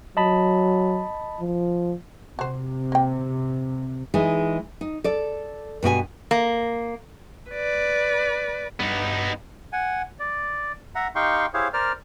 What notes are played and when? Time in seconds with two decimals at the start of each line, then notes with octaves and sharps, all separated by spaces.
0.17 F#3 D#5 A5 B5
1.40 F3
2.39 C3 F#4 C5
2.92 A#3 G5
4.14 E3 G#3 D#4
4.81 D#4
5.04 A4 D5
5.83 G2 B2 F#4 G#5
6.31 A#3
7.51 B4 D5
8.80 G2 B3 D#4
9.73 F#5 G#5
10.19 D5
10.95 E5 F#5 A#5
11.15 D#4 G4 F5 G5 C6 C#6
11.54 E4 G4 G#4 C5 C#5 F5
11.73 A#4 C5 D5 F6